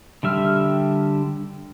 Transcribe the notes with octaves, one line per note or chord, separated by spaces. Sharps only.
D3 G3 E5 F6